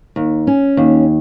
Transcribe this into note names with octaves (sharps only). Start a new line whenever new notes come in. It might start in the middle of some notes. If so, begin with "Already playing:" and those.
D#2
C#4
D#2